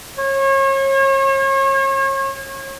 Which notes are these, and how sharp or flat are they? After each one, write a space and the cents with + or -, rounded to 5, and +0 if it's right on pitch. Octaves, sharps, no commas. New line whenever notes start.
C#5 -35